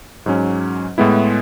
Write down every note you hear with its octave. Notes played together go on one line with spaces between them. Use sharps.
G#2 F#3 C#4
A2 G#3 B3 E4